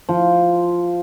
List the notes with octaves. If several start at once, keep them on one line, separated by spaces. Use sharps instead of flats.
F3